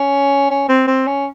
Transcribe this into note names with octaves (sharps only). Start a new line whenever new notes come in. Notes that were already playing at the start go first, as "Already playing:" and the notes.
Already playing: C#4
C#4
C4
C4
C#4